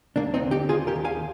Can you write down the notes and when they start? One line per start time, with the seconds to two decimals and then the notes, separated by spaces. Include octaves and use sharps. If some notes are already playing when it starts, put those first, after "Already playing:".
0.16 D#2 A#3 D4
0.34 C4 D#4
0.43 D3
0.51 D#4 G4
0.69 D#2 F4 G#4
0.87 G4 A#4
0.96 D#2
1.04 F5 G#5